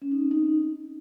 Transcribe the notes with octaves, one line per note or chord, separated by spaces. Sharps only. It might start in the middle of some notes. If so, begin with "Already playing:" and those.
C#4
D#4
C4
D#4